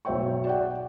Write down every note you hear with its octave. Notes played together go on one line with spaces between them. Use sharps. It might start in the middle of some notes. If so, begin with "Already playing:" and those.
B1 F#3 C#5 E5 G5 C#6
D5 F#5 G5